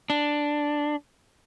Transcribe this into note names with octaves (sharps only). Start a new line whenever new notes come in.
D4